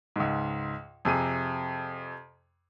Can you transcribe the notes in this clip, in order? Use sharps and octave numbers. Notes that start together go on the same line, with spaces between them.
C#2 G#2
F2 C3 G#4 D#7